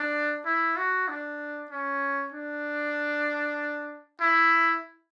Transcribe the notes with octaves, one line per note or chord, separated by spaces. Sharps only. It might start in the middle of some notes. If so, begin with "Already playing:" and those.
Already playing: D4
E4
F#4
D4
C#4
D4
E4